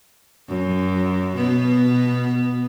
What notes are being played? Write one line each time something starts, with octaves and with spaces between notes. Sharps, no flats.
F#2
B2 B3